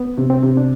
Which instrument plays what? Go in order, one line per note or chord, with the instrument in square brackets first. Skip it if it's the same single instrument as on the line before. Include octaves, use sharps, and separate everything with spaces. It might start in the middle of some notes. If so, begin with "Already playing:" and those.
Already playing: [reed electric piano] B3
[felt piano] C3
[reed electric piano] C4
[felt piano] C3
[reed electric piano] D4